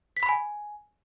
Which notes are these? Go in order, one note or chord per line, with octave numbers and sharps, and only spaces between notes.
B6
B5
G#5